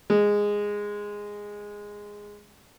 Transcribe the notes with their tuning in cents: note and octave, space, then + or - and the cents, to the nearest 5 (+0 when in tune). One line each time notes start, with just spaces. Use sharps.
G#3 -10